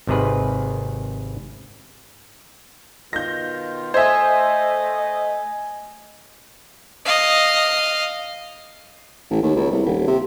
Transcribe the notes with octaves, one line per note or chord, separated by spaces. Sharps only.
G#1 C3 D#3 G#4 B4
B2 D#3 F4 G6 A#6
A3 C5 D#5 E5 G#5 G#6
D#5 F5
A1
D#2
C#2
C2
D#1
C3